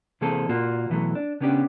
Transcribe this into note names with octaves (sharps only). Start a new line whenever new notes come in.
C3 E3 A#3 C4 G#4 A4
A#2 A#3 F4 F#4
B2 E3 F#3 A3
D4
C#3 B3 C#4 D4 G4